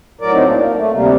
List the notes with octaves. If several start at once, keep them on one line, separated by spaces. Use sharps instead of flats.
A2 F#3 A#4 D5
C4 D#4
A#3 D4
A#3
A3
D2 C3 G3 A#3